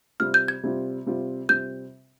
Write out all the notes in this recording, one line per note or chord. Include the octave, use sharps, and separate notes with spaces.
C3 G3 C4 F4 F6
G6
G#6
C3 G3 C4 F4
C3 G3 C4 F4
C3 G3 C4 F4 G6